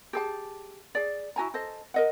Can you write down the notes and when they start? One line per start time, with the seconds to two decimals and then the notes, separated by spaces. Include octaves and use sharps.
0.13 G4 G#4 A5
0.95 G#4 D5
1.36 E4 F#4 G#5 A#5
1.54 A4 C5 D#5
1.94 A#4 D#5 F#5